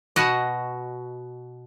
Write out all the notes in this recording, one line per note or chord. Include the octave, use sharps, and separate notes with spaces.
B2 F#4 D#5